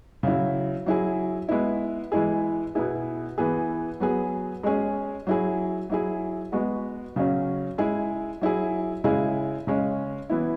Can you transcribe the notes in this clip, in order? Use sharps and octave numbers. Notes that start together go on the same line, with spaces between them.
C#3 F#3 E4
F#3 E4 G#4
G#3 B3 E4
E3 G#3 E4 G#4
B2 B3 E4 G#4
E3 B3 G#4
F#3 B3 G#4
G#3 C#4 G#4
F#3 E4 G#4
F#3 E4 G#4
G#3 B3 F#4
C#3 F#3 C#4
G#3 E4 G#4
F#3 E4 G#4
C#3 G#3 E4 G#4
C#3 G#3 C#4
E3 B3 E4